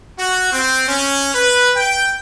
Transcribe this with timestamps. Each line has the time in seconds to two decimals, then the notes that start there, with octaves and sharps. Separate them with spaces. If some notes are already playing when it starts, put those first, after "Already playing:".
0.19 F#4
0.53 C4
0.88 C#4
1.35 B4
1.76 G5